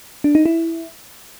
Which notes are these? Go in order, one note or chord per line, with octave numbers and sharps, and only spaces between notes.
D4
D#4
E4